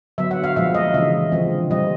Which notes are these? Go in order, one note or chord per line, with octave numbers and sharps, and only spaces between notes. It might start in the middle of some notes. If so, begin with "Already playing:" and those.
D3 F#3 B3 E5
F#5
F5
A#2 F3 G#3 E5
D#5
C#3 E3 G#3 E5
D3 F3 G#3 C4
A#2 G3 C4 D#5